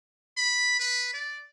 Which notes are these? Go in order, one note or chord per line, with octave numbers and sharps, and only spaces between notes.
B5
B4
D5